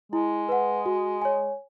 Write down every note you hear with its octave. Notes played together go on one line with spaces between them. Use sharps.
G#3 E4
B4 F#5
F#4
C#5 G#5